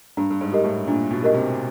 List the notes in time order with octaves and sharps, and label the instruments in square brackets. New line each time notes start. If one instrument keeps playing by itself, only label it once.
[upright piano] G2 [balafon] D4
[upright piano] G2
G#2
[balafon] G4 A#4 D#5
[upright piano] A2
[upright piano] A#2 [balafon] D4
[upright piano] B2
[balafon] G4 A#4 D#5
[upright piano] C3